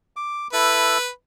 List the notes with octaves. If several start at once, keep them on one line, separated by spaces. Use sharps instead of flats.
D6
E4 A4 B4